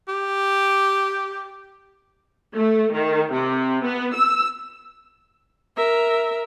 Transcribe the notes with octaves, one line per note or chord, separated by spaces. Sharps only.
G4
A3
D#3
C3
B3
E6
A#4 E5